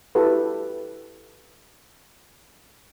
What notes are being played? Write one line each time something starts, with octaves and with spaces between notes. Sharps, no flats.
E4 F#4 G4 A4 B4